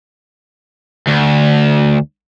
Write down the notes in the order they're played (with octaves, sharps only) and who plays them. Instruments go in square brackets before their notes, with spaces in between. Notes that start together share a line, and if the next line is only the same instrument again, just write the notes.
[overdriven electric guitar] D2